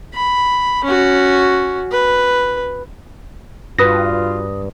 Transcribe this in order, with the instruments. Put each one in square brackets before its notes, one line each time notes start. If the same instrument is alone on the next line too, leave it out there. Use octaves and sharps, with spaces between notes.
[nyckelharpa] B5
C#4 F#4
B4
[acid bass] G2 [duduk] F4 [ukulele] F#4 B4 [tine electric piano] D#6 A#6